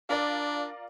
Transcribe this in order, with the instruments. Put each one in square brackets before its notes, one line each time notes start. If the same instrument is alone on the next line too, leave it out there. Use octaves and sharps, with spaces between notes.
[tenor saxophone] D4 [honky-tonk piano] F4 A#4 D5